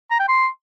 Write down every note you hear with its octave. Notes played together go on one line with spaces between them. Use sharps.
A#5
G5
C6